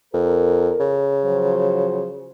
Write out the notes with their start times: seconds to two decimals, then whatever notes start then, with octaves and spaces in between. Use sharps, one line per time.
0.14 F2 A#4
0.80 C#3
1.25 F3 F#3 C5